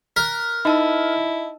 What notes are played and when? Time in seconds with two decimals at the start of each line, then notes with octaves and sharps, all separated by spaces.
0.16 A#4 F#6 B6
0.65 D#4 E4 D#5 A5 E6